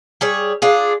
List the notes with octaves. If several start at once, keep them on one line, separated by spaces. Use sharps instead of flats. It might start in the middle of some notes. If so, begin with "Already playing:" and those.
G3 G#4 C#5
D4 F4 G#4